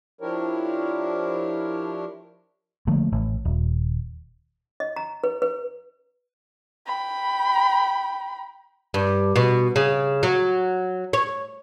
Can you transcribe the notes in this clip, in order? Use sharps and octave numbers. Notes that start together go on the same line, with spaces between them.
F3 D4 E4 G4 A#4 C#5
D3 F3 A3 A#3
A1
D#1
D#5
A#5
B4
B4
G5 B5
G2
B2
C#3
F#3
C#5